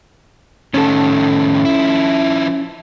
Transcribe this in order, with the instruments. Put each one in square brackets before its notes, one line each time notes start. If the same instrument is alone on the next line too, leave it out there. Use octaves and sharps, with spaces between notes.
[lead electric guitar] A2 D#3 [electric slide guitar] C#4 A4
[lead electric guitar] F3 E4